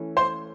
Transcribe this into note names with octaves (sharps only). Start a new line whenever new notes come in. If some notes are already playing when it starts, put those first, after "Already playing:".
Already playing: E3 A3 C#4
C5 C6